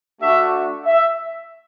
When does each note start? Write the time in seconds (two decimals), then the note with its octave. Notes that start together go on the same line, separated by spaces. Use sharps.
0.20 A3 D4 F#4 E5
0.85 E5